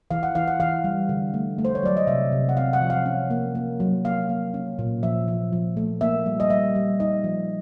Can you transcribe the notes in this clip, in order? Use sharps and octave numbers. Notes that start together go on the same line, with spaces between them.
E3 F5
F#5
E3 F5
F#5
E3 F5
G3
D3
A3
A3
C5
C#5
F#3 D5
D#5
C3 E5
C3
F#5
C4 F5
F#5
F3
F5
C#4
A#3
A#3
F#3
A#3 F5
A#3
C#4
A#2
F3 E5
F3
F3
A3
A#3 E5
G3
D#5
G3 E5
G3
D#4 D#5
F3